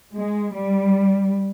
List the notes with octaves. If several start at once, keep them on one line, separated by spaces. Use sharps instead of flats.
G#3
G3